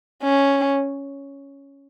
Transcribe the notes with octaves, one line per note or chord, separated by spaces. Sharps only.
C#4